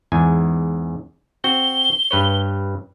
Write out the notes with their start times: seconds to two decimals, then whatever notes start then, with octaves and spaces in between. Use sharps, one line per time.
0.12 E2 G#2 G#5
1.44 C4 F#4 G7
2.11 G2 B4 C#5